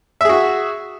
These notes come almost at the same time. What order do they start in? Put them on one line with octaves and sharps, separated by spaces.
E5 G#4 F#4